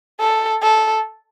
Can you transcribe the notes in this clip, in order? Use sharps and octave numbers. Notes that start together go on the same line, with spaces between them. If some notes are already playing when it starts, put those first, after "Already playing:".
A4
A4